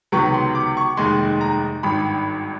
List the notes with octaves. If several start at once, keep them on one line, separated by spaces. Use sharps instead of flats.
C#2 C3 D#3 F#3 B3 C#6
C6
D6
C#6
F1 D#2 D#3 G#3 C6
A#5
G#1 G2 D#3 B5